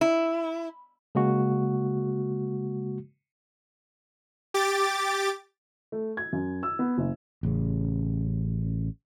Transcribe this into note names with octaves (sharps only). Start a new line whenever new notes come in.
E4
C#3 G#3 A#3 F#4
G4 D6 A6
A3
G#6
F#2
E6
B3
F#1
A1 C#3